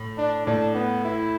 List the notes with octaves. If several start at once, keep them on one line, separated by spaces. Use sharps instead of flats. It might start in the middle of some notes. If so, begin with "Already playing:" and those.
Already playing: A2
D4
A2 D4
B3
E4